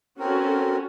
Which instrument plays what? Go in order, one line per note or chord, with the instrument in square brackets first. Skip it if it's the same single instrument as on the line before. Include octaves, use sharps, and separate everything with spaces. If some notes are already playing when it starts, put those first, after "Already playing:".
[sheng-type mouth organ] C4 A#4 [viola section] C#4 F#4 A4